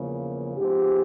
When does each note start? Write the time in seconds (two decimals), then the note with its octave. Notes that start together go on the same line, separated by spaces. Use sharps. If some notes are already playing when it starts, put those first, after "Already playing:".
Already playing: E2 C#3 F3 A#3
0.57 G#2 F3 G#3 B3 G4